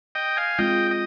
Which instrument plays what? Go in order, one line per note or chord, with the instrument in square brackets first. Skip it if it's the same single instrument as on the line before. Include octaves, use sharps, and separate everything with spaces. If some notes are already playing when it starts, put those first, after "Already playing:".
[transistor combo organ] D#5 G5
F5 G#5
[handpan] G#3 C4 F4 [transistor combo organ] D#5 G5
[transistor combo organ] D#5